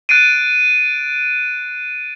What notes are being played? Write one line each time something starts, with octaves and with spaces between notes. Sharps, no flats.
F#6 A6 C7 D7 D#7